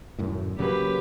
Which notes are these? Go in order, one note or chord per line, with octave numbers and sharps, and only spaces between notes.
D#1 F#2 A2
C#3 F#3 A#3 G4 B4